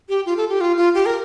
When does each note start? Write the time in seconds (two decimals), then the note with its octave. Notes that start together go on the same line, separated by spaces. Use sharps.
0.09 G4
0.26 F4
0.37 A4
0.49 G4
0.61 F4
0.77 F4
0.95 G4
1.06 A#4